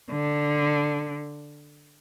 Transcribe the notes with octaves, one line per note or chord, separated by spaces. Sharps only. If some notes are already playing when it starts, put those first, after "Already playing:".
D3